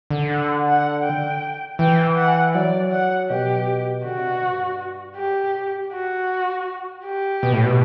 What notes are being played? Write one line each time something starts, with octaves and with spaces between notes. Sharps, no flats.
D3
F#5
F#5
G5
E3 G5
F#5
F#3 D5
F#5
B2 G4
D3 F#4
C3
B2
G2
F#2 G4
G2
B2
G2
F#4
F#2 G4
A2
B2
A2
B2